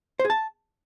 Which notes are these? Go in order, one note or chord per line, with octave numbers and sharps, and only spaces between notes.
C5
G#4
A5